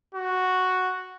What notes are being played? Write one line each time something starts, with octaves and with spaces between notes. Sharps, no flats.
F#4